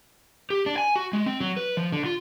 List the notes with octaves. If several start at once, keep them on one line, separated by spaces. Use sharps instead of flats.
G4
D4
G#5
F#4
G#3
C4
F#3
B4
F3
D3
F4